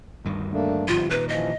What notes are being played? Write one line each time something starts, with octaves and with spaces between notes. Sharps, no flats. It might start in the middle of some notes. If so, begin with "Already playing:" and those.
D2 G2 D#3
A3 A#3 D4
G1 G#2 C3 F3 F4
A#2 D#3 B4
E3 F3 D#5